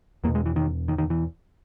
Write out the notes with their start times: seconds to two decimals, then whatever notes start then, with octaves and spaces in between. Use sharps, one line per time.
0.24 E2 A#3
0.28 B2
0.35 G#3
0.46 E3
0.56 D#3
0.88 D#3
0.98 D#3
1.10 E3